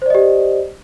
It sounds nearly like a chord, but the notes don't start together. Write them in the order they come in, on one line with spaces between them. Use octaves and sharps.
C5 D5 D#5 G4